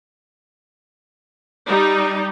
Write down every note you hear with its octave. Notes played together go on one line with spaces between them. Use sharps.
G3 D#4